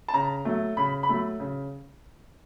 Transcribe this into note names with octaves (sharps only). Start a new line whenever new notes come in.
A5
C#3 A#5
F#3 A3
C#3 B5
B5
F#3 A3
C#3